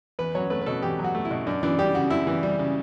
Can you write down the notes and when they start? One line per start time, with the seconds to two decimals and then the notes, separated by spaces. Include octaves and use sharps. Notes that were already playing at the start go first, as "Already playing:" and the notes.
0.19 E2 B4
0.35 F#3 C#5
0.50 A3 B4
0.62 B4
0.66 B2 A4
0.82 E2 G4
0.99 F#3
1.04 F#4
1.15 A3
1.25 E4
1.31 B2
1.46 F#2 D4
1.63 E3 D4
1.79 G3 G4
1.95 C#3 F#4
2.10 F#2 E4
2.27 E3
2.43 G3
2.59 C#3